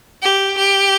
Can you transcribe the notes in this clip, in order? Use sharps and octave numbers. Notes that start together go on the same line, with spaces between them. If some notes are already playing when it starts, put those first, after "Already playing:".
G4
G4